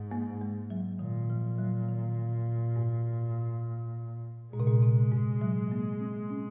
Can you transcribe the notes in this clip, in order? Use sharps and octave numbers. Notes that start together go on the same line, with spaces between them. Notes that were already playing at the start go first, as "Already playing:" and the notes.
Already playing: G#2
A#3
G#3
F#3
A#2 D#3
F3
F#3
D#3
G#2
A#2 G#3
C3
A#2
C3
G#2
F#3
A#3
C4
C#4